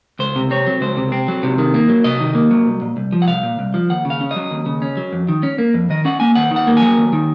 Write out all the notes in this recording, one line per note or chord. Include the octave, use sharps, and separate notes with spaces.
C#2 C5
C3
C4 C#5
F#3
C#2 C5
C3
C4
F#3
C3
D#3
A#3
F#3
C3 D#5
D#3
A#3
F#3
C2
A#2
C2
F3
F#5
C2 F5
A#2
C2
F3
D#2 F#5
C#3
F5
C#4
D#5
F#3
D#2
C#3
C#4
F#3
F2
D#3
C#4
A#3
F2
D#3 D#5
C#4 F#5
A#3 G#5
D#2 F#5
D#3
F#5
A#3
F#3 G#5
D#2
D#3